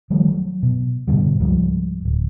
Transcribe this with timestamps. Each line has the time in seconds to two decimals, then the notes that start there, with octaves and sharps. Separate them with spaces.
0.10 D#3 F3 G3 A3
0.28 F#3
0.63 B2
1.08 G#2 B2 D3 G3
1.39 C#2 G#2 F3 G3
2.05 D1